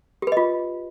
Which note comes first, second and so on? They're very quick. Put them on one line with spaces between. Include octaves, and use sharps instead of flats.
G4 B4 D#5 F4